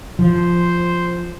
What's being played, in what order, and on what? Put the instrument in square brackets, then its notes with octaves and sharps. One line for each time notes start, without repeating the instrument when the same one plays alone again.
[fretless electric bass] F3 [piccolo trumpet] C5